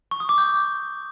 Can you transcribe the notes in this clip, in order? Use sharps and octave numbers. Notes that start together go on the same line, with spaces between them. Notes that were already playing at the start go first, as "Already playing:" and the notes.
C#6
D#6
D6
G6